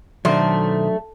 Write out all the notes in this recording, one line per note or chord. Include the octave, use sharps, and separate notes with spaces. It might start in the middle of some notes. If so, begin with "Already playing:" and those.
B1 D#3 F#3 A3 D4 C5